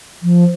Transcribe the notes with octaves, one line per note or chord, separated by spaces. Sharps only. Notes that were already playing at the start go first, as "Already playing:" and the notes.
F3